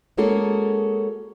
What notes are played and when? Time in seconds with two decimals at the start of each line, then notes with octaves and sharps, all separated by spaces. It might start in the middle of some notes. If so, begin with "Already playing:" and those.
0.17 G#3 A#3 C#4 F#4 G#4 A4